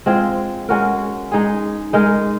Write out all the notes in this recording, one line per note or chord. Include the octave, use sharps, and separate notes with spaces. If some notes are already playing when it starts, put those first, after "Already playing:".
G#3 C4 F4 G#4
G#3 C#4 F#4 A#4
G#3 D#4 G#4
G#3 D#4 A#4